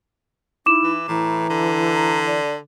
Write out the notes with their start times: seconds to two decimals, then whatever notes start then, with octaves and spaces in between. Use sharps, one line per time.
0.66 D#4 E4 D6 E7
0.84 E3
1.08 A2 E3 A#5
1.50 D3
1.94 A#5
2.26 D5